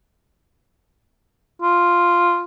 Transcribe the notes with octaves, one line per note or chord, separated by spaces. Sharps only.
F4